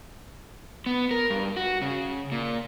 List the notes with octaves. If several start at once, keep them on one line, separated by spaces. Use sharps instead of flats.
B3
A#4
G2
F#4
C#3
A#2